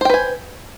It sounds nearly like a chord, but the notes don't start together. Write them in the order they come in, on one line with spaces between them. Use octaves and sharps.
C5 G5 B4 G#5